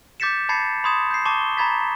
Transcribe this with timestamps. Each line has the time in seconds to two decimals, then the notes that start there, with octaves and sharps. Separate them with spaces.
0.20 D6 G6 A6 B6 C#7 E7
0.49 A5 B5 G#6 A6 C7 C#7
0.84 B5 C6 D#6 G#6 E7
1.11 G6 C7
1.25 A5 C#6 D6 E7 G7
1.57 A#5 B5 G#6 A6 B6